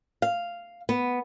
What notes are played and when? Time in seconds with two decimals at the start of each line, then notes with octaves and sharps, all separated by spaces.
0.22 F5
0.89 B3